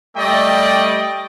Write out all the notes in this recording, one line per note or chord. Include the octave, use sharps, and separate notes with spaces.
G3 A3 D5 D#5 G5